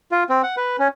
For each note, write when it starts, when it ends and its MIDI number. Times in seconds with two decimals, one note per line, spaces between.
0.12 0.24 65
0.29 0.42 60
0.43 0.56 78
0.57 0.77 71
0.79 0.88 61